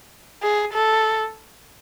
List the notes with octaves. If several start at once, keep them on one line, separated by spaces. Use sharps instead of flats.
G#4
A4